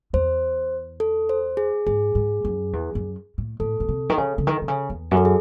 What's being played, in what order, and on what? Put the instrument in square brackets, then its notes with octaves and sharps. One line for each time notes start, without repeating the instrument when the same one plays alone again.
[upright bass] E2 [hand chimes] C5
[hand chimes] A4
C5
G#4
[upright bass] G#2 [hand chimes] G#4
[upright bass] G#2
F#2
E2
F#2
A2
[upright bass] A2 [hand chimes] A4
[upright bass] A2
C3
D#3
C#3
C#3
D#3
C3
C#3
E2
F#2
[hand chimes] A4
G#4